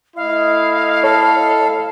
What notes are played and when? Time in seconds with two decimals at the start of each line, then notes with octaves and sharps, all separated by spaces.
0.16 A3 E4 D#5 F5
1.04 A4 C#5